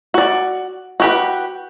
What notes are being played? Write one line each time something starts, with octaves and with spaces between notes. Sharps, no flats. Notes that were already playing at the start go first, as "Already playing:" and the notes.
F#4 D5
F#4 G4 B4